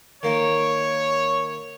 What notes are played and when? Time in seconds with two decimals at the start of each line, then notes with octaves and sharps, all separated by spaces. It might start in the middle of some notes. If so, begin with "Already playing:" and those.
0.23 D#3 A#3 C#5